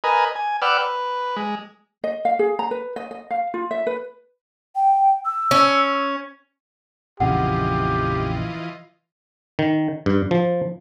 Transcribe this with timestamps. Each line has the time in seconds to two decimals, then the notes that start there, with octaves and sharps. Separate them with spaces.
0.04 A#4 B4 D#5 G#5
0.35 G#5
0.62 B4 D5 F#5 G5 E6 F6
0.78 B4
1.37 G#3
2.04 D#5
2.25 F5
2.39 G#4
2.59 A#5
2.71 B4
2.96 D#5
3.11 D#5
3.31 F5
3.54 F4
3.71 E5
3.87 B4
4.76 G5
5.26 E6
5.51 C#4
7.20 A#1 F2 C#3 E3 F4 G4 D#5 F#5
9.59 D#3
10.06 G2
10.31 F3